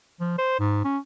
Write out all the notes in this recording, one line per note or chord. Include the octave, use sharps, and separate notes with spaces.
F3
C5
G#2
C#4